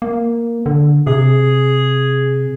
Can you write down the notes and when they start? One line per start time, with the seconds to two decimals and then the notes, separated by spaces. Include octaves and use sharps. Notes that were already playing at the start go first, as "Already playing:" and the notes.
0.02 A#3
0.66 D3
1.07 C3 G#4